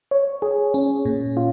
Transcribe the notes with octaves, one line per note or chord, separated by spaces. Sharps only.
C#5
G#4
C#4
A#2
F4